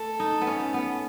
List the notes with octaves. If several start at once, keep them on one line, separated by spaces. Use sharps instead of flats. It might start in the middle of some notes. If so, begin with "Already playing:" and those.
Already playing: A3 A4
D#4
B3
C#4
B3